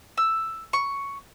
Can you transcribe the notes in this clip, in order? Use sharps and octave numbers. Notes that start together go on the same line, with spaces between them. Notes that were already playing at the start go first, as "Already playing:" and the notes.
E6
C#6